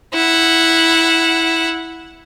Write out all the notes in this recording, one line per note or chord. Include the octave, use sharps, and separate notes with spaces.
E4 F#5